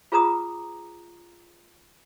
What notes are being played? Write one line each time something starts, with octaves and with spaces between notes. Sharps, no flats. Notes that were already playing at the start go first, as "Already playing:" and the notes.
F4 G#4 B4 A#5 D6 D#6